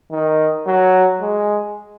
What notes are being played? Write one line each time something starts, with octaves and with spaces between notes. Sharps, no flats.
D#3
F#3
G#3